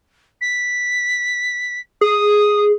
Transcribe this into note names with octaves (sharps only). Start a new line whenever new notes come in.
B6
G#4 D#6